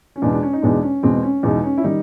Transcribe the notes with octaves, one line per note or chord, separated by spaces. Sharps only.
C#4
E2 B2 G#3 D4
D4
C#4
D#4
E2 B2 G#3 D4
C#4
E2 B2 G#3 C4
C#4
E2 B2 G#3 D#4
C#4
E4
D#3 G3 D#4